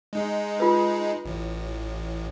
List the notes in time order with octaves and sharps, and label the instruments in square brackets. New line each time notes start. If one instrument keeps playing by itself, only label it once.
[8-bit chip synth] G#3 D#4 G#4
[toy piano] F4 B4
[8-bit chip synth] A1 A2